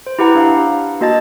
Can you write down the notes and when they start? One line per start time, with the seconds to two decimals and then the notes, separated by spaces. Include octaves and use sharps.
0.07 C5
0.19 E4 G4 B4 F#5 A#5
0.35 D4 F5
1.01 A#3 F#4 D#5 A5 A6